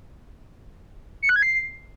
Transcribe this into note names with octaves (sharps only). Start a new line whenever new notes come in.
C#7
F#6
G#6
C7